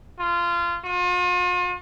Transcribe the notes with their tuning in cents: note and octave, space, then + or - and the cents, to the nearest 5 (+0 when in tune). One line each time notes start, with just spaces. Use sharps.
F4 -20
F4 +45